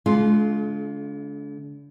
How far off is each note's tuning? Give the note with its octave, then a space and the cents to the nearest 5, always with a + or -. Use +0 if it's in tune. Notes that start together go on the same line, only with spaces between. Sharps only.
D3 -40 G#3 +40 F4 +0